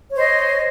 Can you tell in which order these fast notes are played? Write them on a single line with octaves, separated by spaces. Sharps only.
C#5 C5 D#5